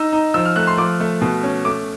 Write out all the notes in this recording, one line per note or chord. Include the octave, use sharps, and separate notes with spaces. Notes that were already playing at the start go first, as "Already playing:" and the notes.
Already playing: D#4 E6
D#4
F3 E6
F6
A3 F#6
C6
F3 D6
A3
B2
C#4
A3 D6